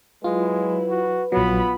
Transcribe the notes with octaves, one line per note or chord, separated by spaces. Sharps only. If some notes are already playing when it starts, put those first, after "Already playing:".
F#3 G#3 E4 F4 B4
F#4
A#1 F#3 B3 F4 B5